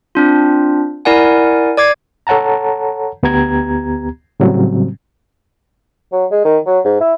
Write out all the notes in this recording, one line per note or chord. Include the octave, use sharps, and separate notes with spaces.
C4 D4 F4
E4 A#4 D5 F#5 G#5
D5 D6 G#6 C7
A4 C#5 F#5 A5 A#5
D2 B3 G4 A#5 G#6
A2 C#3 F#3 G3 C4
F#3
G#3
D#3
F#3
G#2
E4